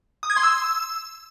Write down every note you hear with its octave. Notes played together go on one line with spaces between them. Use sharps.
D#6
G#6
C6
E6